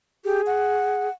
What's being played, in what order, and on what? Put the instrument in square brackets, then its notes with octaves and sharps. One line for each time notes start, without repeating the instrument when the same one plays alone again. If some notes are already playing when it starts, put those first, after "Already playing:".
[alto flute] G4 [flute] G#4
[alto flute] F#5